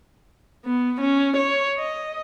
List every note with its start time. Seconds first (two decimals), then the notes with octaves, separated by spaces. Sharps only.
0.65 B3
1.01 C#4
1.37 C#5
1.78 D#5